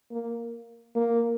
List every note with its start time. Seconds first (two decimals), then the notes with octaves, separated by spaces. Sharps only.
0.11 A#3
0.96 A#3